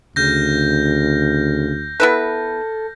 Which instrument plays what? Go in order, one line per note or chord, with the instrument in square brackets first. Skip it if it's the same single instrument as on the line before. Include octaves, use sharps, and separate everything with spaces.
[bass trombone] D2 [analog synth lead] C#3 [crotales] F6 G6 A#6
[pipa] B3 E4 B4 [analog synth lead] A4